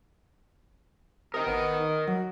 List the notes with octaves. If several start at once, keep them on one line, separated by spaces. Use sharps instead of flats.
C3 A#4 D#5 D#6
G#1 B3
D#3
F#3 F#4